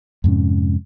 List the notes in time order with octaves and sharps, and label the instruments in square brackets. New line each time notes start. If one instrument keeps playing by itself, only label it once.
[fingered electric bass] F2 G#2 C3 C#4